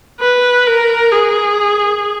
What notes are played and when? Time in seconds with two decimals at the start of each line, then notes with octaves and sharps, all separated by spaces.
0.20 B4
0.67 A#4
1.12 G#4